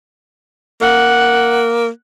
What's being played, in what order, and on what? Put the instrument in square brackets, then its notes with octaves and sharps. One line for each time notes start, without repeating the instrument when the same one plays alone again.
[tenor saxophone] A#3 [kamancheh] F#5